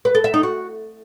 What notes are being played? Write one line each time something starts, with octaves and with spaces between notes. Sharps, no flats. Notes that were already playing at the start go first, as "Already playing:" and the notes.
B4
A4
E5
D#4
F#4